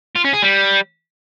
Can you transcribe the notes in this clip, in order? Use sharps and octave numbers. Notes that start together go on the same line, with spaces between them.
F4
C#4
G#4
G3